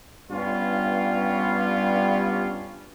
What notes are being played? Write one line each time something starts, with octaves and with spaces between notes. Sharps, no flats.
G2 G3 B3 C#4 F4